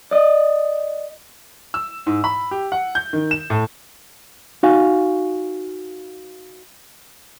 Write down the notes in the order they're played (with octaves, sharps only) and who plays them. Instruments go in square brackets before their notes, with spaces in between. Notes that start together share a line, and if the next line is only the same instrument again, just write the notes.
[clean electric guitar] D5 D#5
[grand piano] E6
G#2
B5
G4
F#5
G6
D#3
E7
A2
[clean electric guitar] D#4 F#4 F5 G#5